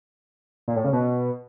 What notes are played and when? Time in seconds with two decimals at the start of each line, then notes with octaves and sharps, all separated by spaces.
0.68 A#2
0.76 A2
0.84 C#3
0.93 B2